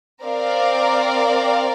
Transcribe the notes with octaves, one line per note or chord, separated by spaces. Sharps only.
C4 A#4 D5 F5